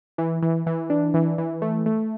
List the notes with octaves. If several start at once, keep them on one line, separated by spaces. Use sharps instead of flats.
E3
E3
E3
D4
E3
E3
A3
A3